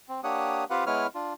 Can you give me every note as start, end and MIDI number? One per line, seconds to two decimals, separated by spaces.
0.09 0.21 60
0.24 0.64 58
0.24 0.64 62
0.24 0.64 67
0.24 0.64 73
0.24 0.64 78
0.24 0.64 87
0.70 0.84 60
0.70 0.84 65
0.70 0.84 67
0.70 0.84 71
0.70 0.84 77
0.70 0.84 78
0.87 1.07 56
0.87 1.07 59
0.87 1.07 64
0.87 1.07 71
0.87 1.07 73
0.87 1.07 89
1.15 1.33 62
1.15 1.33 65